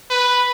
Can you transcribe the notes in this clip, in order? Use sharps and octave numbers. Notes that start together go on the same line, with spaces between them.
B4